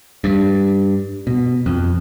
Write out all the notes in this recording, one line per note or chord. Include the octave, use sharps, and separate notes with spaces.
G2
B2
F2